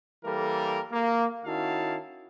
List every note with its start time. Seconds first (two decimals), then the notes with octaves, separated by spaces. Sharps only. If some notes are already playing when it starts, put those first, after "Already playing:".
0.24 E3 G3 A#3 A4 A#4
0.92 A#3
1.45 D#3 C#4 E4 F#4 F5 A5